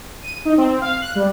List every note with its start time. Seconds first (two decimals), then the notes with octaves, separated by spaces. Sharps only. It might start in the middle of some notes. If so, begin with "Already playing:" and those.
0.22 D#7
0.45 D#4
0.57 C4
0.81 F5
1.02 F#6
1.15 G3